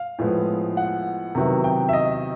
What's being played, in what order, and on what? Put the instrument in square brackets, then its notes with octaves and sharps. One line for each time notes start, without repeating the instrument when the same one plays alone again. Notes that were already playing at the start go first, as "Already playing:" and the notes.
Already playing: [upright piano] F5
A2 F3 G#3 B3
F#5
C3 D#3 F#3 B3 E4
G5
E5
D#5